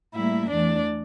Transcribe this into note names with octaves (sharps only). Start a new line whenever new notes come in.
A2 G3 A#3 E4 E5
E2 E3 A3 D4 D5